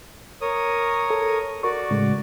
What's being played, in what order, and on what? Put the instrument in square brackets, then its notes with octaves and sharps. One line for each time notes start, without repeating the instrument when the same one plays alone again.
[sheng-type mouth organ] A#4 C#5 D#6
[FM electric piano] A4
[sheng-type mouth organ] F#4 D5 [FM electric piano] A#4 C#6
[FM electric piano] A2 C#3 G#3